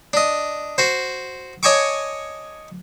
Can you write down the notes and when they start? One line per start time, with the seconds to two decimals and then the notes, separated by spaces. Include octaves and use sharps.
0.13 D4 D#5
0.78 F#4 C5
1.63 C#5 D#5 G#5 A5 C#6 D6